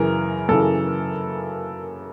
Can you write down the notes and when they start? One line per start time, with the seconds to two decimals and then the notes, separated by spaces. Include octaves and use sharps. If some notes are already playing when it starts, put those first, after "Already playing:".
Already playing: F#2 C#3 E3 A#4
0.49 F#2 C#3 E3 A4